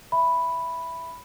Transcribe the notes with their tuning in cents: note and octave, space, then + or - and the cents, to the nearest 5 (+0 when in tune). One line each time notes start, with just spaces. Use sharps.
E5 +0 B5 +0